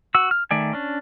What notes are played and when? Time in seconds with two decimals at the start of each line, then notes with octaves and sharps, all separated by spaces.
0.15 F#4 E6
0.31 F6
0.51 D#3 A3 D5 G#5
0.73 C#4 D4